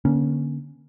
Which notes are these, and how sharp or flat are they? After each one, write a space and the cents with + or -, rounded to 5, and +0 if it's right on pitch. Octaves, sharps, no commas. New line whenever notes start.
D3 +0 A#3 +35 C#4 +0